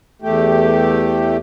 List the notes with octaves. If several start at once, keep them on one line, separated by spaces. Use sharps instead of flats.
E2 A3 G4